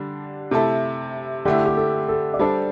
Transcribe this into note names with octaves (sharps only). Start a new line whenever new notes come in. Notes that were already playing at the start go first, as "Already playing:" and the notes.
Already playing: D3 G3 D4
C3 A3 E4 A4
D3 A3 E4 G4
G4
A4
A4
D5
G3 D4 A4 C5